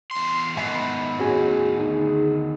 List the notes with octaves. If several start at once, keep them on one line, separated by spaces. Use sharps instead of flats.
E2 C6 C7
G#2 D#3 B3 D#5 E5 G#5
B5
D#2 A2 C#4 F#4 G#4 D#5 G#5
D2 D#4 G#5